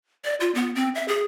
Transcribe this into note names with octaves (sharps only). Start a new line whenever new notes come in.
D5
F4
B3
C4
E5
G#4